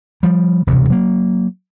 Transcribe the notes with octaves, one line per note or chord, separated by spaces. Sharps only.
F3 G3
E1 D2 G2 C3
F#3 A#3